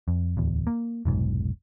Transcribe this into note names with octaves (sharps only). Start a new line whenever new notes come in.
F2
D1 E2
A#3
F1 B1 G#2